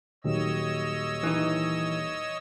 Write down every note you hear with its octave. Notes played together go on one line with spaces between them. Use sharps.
D#1 D#3 F#3 C#5 D#5 E6
E3 D#4